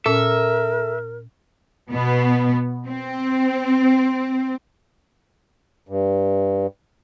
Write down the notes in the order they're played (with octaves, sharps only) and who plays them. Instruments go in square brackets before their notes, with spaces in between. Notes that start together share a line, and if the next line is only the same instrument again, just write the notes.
[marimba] A#2 C#4 [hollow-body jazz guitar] A4 [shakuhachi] A#4 [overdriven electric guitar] E5
[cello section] B2 B3
C4
[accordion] G2